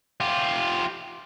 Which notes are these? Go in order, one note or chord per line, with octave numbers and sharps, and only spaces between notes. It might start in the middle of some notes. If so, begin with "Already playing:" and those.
F4 G4